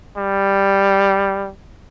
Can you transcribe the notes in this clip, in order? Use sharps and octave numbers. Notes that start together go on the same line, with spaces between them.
G3